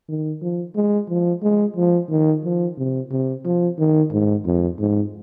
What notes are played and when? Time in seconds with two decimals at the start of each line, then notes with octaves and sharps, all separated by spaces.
0.09 D#3
0.42 F3
0.75 G#3
1.09 F3
1.42 G#3
1.77 F3
2.10 D#3
2.44 F3
2.78 C3
3.11 C3
3.45 F3
3.79 D#3
4.12 G#2
4.45 F2
4.79 G#2